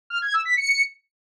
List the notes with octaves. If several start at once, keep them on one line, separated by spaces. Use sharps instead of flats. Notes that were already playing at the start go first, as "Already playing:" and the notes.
F6
G#6
E6
B6
C#7